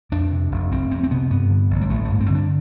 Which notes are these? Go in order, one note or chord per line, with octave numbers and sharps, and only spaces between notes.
F2 D4
C3
F1
F1 C4
F2 C4
C4
C3 B3
G2 B3
D3
A1
G3
A1 A3
G2 A3
C4
D3
D4